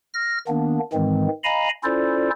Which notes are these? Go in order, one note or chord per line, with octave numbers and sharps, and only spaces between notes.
F6 A#6
D#3 A#3 B3 D4
G#2 D#3 E3 G#3 C4
D#5 F5 G#5 A#5 B5
C#4 E4 F4 A4 C5 D5